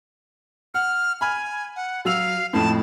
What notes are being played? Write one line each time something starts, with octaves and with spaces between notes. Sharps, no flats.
F#5 F6
G#5 B5 F6
F#5
F#3 F5 E6 F7
F2 A2 A5